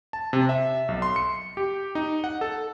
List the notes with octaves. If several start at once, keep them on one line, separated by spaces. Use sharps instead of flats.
A5
C3
E5
B1
C6
C#7
G4
D#4
F#5
A4